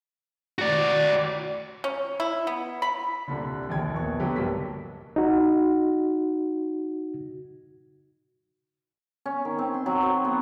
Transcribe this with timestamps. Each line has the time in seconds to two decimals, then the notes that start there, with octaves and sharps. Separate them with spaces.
0.59 F#4 D5
1.84 C#4
2.20 E4
2.47 B3
2.82 B5
3.28 C2 A#2 D3
3.69 A#1 D#2 G5 G#6
3.94 A#1 A#3 B3 C#6
4.19 B2 D3 F#3 G4 B4
4.36 B1 G2 A#3 B6
5.16 D#4 F#4
9.26 C#4
9.45 D#3
9.59 C4
9.74 C6
9.86 F#3
10.03 C5
10.25 B3